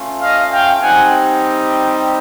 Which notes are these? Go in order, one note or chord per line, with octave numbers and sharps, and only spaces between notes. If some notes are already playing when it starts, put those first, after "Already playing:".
Already playing: A3 C#4 F4
D#5 F5
F5 G5
G3 C4 D#4 G4 F#5 G#5